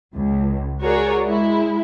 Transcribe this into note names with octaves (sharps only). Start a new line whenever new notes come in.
C#2
F#4 G#4 A#4 C#5 D5
G#3 E4